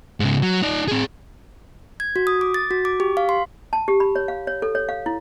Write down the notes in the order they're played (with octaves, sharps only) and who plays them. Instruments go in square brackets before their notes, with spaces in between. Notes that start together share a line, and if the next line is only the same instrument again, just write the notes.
[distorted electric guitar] G#2 C#3
F#3
D#4 D5
C4 G#4
[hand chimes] G#6
F#4
D#6
D6
A6
F#4
D6
G4
F5
C6
[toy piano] A5
G4
B5
C#5
F5
C#5
A4
C#5
F5
E4